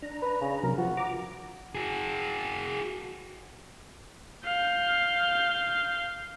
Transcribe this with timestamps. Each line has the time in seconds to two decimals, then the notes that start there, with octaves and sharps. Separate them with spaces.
0.02 D4 A#5
0.22 B4
0.41 C#3
0.63 C3 F#3 A#4
0.78 F3 F4 F#4
0.97 A#5 D6
1.75 F#4 G#4
4.45 F5 G6